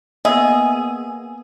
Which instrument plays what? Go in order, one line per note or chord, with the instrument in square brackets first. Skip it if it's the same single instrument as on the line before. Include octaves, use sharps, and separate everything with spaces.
[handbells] A#3 B3 [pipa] G#4 [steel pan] D#5 E5